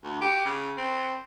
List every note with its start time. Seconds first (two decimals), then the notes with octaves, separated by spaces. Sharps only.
0.04 D2
0.21 G4
0.45 C#3
0.77 C4